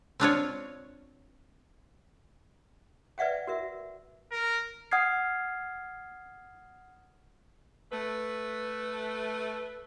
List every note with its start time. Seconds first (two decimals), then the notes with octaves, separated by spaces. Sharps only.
0.20 C4 D4 F4 C#5
3.18 B4 D5 E5 F#5 G5
3.47 F#4 A#4 E5
4.32 A#4
4.91 F#5 D#6 F6 G#6 C7
7.92 A3 B4